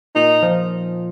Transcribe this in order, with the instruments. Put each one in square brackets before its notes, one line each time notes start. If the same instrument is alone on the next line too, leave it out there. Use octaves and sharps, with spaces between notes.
[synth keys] A#2 [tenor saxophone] D#4
[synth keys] F3